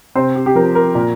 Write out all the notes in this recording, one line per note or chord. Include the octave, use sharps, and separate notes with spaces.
C3 C4 C5
G4
G4
F3 A#4
A#4
A#2